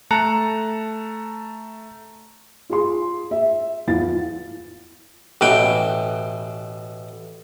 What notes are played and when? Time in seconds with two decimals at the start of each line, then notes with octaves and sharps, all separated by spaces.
0.11 A3 A5 A#5 F#6 C#7
2.70 F4 G#4 C6
3.31 E5
3.87 E2 F3 B3 F5 A6
5.41 A1 B2 E3 B4 G5